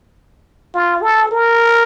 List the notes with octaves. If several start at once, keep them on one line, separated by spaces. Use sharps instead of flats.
F4
A4
A#4